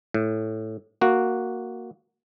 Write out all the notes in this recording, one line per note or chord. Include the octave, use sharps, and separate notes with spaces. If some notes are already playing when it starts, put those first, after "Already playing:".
A2
A#3 F#4